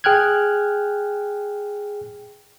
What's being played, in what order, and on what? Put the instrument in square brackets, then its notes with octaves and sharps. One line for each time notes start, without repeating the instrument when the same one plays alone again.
[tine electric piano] G#4 G5 F6 F#6 G#6